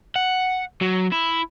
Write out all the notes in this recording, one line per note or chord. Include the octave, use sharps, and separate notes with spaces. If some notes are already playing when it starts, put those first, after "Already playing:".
F#5
F#3
E4